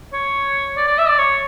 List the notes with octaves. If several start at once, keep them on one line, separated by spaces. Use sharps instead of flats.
C#5
D5
D5
E5
D5
C#5